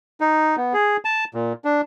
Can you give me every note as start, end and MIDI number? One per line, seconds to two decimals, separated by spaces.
0.21 0.56 63
0.57 0.73 59
0.74 0.97 68
1.05 1.25 81
1.34 1.53 46
1.65 1.81 62